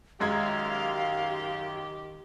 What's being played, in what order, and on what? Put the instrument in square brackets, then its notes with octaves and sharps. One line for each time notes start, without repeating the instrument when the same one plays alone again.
[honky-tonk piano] F#2 G#3 G#6 [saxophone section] D#3 G4 [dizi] F5